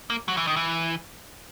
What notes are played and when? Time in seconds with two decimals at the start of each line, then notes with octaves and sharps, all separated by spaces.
0.10 A#3
0.28 F#3
0.37 E3
0.47 D#3
0.56 E3